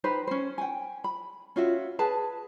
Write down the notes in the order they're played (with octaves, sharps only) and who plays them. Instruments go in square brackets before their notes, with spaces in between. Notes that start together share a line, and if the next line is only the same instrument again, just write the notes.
[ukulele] D#4 G4 B4 C5
C#4 C5
G5 G#5
B5
C#4 F4 F#4 E5
G#4 B4 A5